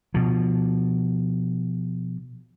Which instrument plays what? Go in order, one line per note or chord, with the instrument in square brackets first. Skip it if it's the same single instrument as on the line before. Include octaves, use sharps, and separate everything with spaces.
[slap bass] B2 F3